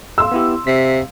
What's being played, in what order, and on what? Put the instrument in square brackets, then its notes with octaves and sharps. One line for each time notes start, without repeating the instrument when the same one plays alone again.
[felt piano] F5 C6 E6
[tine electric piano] B3 E4 G4
[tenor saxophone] C3 [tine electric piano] B6